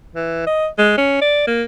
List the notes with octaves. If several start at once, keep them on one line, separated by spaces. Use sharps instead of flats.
E3
D#5
G#3
C#4
D5
A#3